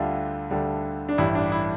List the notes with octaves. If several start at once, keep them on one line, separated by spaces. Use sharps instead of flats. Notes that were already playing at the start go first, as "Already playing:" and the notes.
Already playing: D2 D3 G3 F4
D2 D3 G3
D4
A1 G2 E3 G3 E4
D4
E4